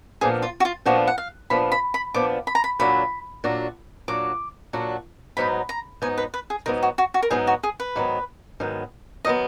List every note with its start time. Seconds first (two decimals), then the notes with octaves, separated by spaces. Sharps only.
0.21 A#2 F3 B3 D4 G#4
0.42 F4
0.60 F#4
0.65 F4
0.85 A#2 F3 B3 D4 F#4
1.07 F#5
1.18 F5
1.50 A#2 F3 B3 D4 B5
1.72 B5
1.94 B5
2.14 A#2 F3 B3 D4 D6
2.47 B5
2.55 A#5
2.64 B5
2.79 A#2 F#3 D4 F#4 B5
3.44 A#2 F#3 D4 F#4
4.08 A#2 F#3 D4 F#4 D6
4.73 A#2 F#3 D4 F#4
5.37 G#2 F#3 B3 D#4 B5
5.69 A#5
6.02 G#2 F#3 B3 D#4 G#5
6.18 B4
6.34 B4
6.50 G#4
6.66 G#2 F#3 B3 D#4 A#4
6.83 F#4
6.98 F#4
7.14 F#4
7.23 A#4
7.30 G#2 F#3 B3 D#4 G#4
7.47 F#4
7.63 G#4
7.80 B4
7.96 G#2 D#3 F#3 B3
8.60 G#2 D#3 F#3 B3
9.25 D#3 F#3 B3 D#5